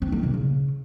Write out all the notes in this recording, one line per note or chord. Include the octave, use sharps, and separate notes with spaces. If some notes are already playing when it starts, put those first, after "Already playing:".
C4
A#3
C3
C#3